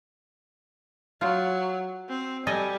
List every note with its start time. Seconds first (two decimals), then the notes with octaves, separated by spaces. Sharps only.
1.21 F#3 F4
2.09 C4
2.47 G3 A4 D#5 G#5